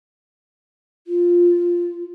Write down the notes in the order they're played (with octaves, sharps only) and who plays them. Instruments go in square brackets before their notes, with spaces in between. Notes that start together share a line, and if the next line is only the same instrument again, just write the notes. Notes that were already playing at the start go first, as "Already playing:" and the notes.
[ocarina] F4